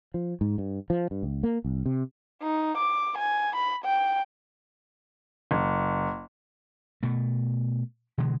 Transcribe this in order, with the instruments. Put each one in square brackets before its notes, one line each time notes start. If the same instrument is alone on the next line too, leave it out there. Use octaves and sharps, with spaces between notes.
[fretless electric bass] F3
G#2
G2
F3
G2
C#2
A#3
C2
C3
[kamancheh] D#4
D6
G#5
B5
G5
[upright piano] F#1
[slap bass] B2 A3
B2 D3 E3 G#3